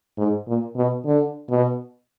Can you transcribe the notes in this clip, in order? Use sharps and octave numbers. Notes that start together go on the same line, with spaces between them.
G#2
A#2
B2
D3
B2